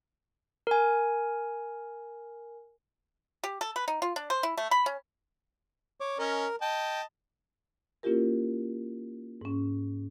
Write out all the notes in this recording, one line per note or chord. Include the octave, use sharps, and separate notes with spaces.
A#4 G#5
G4
A4
B4
D#4
F4
D4
C5
E4
A3
B5
C#4
C#5 D6
C#4 A#4 D#5
D#5 G5 A5
A#3 C#4 E4 F4 G4 A#4
G#2 C#4